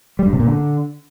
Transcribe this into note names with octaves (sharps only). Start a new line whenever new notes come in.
G3
G2
C3
A#2
D3